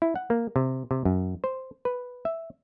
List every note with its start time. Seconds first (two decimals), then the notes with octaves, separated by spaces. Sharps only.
0.02 E4
0.16 F#5
0.30 A#3
0.56 C3
0.91 C3
1.05 F#2
1.44 C5
1.85 B4
2.25 E5